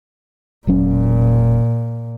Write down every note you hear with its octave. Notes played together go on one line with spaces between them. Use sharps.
E1 A#2 F#3 C#4